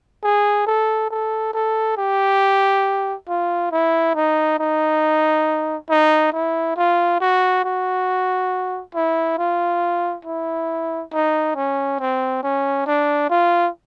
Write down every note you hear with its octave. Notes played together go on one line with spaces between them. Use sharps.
G#4
A4
A4
A4
G4
F4
E4
D#4
D#4
D#4
E4
F4
F#4
F#4
E4
F4
E4
D#4
C#4
C4
C#4
D4
F4